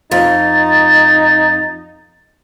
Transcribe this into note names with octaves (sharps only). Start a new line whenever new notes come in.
F2 D#4 A6